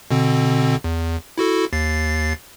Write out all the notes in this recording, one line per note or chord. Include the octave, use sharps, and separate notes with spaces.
B2 D3 C4
E2
E4 F#4 A4
D#2 A6 C7